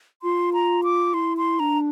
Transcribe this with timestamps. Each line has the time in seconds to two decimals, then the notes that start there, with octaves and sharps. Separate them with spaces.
0.22 F4 C6
0.54 A#5
0.84 D6
1.14 E4 C6
1.38 C6
1.59 D4 A#5